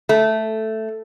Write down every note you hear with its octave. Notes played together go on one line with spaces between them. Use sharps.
A3